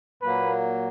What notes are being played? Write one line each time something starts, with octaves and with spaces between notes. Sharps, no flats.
A#2 F#3 A#3 B4